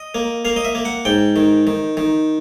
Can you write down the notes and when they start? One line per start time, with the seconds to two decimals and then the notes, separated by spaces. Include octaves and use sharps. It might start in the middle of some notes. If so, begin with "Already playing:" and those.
Already playing: D#5
0.15 A#3
0.45 A#3 F5
0.56 D#5
0.65 E5
0.75 A#3
0.85 F#5
1.05 G#2 G5
1.36 D#3
1.67 D#3
1.97 D#3